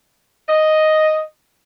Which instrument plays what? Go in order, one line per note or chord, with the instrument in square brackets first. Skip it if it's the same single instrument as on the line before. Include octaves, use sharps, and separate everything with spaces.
[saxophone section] D#5